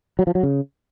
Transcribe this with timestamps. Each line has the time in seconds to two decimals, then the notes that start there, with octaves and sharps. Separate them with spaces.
0.19 F#3
0.27 F3
0.35 F#3
0.43 C#3